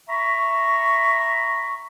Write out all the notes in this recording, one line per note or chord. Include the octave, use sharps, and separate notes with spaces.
E5 A#5 B5 C#6